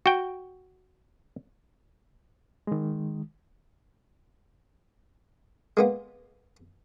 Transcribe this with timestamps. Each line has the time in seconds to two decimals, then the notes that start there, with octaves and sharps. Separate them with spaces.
0.06 F#4 G5
2.67 D#3 G#3
5.77 G#3 A#3 B3